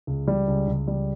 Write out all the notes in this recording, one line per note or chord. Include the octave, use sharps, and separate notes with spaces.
C#2
G3
C#2
C#2
G3